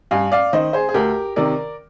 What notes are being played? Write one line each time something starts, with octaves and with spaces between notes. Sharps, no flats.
G2 F5 G#5
D5 F5
D#3 C5 D#5
G#4 C5
G#4
D2 G4 A#4
C3 D#3 A#4 D5